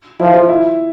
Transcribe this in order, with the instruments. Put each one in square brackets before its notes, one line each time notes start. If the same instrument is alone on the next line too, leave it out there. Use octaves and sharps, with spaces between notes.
[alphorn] F3 [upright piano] E4
[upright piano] F4
E4